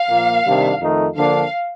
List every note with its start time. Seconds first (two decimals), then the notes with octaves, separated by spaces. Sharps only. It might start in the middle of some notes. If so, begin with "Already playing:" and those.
Already playing: F5
0.09 A#2 F3 A#3
0.45 C3 D#3 G3 D4
0.80 F2 D#3 A3 D#4
1.16 D3 F3 A#3 D4 F5